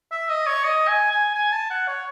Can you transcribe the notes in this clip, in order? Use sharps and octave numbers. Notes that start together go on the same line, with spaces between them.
E5
D#5
C#5
D#5
G#5
G#5
G#5
A5
F#5
C#5